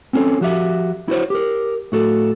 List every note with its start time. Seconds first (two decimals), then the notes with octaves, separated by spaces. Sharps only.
0.13 C4 C#4 F4 A4 C#5
0.41 F3 F#4 G4 E5
1.08 E4 F#4 A4 C5 C#5
1.30 G4 A#4
1.92 A2 F#4 A4